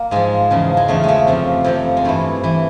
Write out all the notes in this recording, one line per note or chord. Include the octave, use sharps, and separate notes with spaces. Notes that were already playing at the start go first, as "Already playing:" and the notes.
Already playing: A#3
G#2 F3 G#3
E2 C#3 F3
G#3
E2 C#3 F3 A3
G#3 A3
F2 C3 F3
F2 C3 F3
G#3
G2 E3 A3
E3